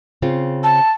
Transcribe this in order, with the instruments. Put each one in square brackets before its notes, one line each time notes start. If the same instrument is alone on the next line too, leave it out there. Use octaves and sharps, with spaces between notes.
[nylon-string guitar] C#3 C4 F4
[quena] A5